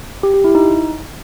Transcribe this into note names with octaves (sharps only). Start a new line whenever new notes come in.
G4
G4
E4
D#4